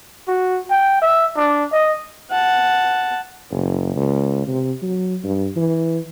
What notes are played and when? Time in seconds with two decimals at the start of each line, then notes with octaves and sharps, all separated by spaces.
0.28 F#4
0.70 G5
1.02 E5
1.36 D4
1.72 D#5
2.31 F#5 A5
3.51 F#1
3.96 C#2
4.47 C3
4.82 F#3
5.24 G2
5.56 E3